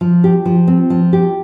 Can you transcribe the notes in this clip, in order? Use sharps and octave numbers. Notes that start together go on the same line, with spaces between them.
F3
G4
F3
C4
F3
G4